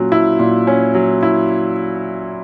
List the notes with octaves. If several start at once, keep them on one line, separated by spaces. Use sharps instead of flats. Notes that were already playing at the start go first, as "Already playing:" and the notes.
Already playing: A#2 F#3 C#4
E4
A#2
C#4
F#3
E4